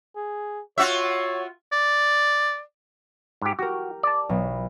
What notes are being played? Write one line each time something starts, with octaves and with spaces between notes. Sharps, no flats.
G#4
F4 F#4 C#5 E5
D5
G#2 G4
F#4 G4 A#4
D5 A5
B1 B2